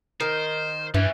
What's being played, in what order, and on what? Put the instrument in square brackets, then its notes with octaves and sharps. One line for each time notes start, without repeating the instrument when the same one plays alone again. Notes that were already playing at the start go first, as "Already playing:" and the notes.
[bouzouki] D#3 [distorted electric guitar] C5
[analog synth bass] G2 [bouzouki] E3 [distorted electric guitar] G3 C#4